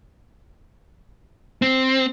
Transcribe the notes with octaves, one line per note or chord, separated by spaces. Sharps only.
C4